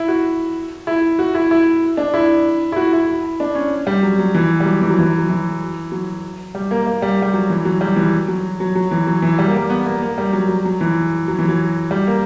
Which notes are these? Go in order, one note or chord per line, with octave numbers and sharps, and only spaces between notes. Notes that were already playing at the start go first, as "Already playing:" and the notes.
Already playing: E4
F#4
E4
F#4
E4
E4
D4
E4
E4
F#4
E4
D4
C#4
G3
F#3
F#3
E3
G3
F#3
E3
F#3
E3
F#3
E3
F#3
G3
A#3
A#3
G3
G3
F#3
E3
F#3
G3
E3
F#3
F#3
F#3
E3
F#3
E3
G3
A#3
G3
B3
A#3
A#3
G3
F#3
F#3
F#3
E3
F#3
E3
F#3
G3
A#3